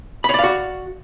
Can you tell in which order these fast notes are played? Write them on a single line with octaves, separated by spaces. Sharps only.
B5 C#5 D5 F5 F#4